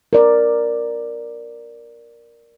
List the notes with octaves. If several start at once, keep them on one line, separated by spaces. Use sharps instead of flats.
A#4 D5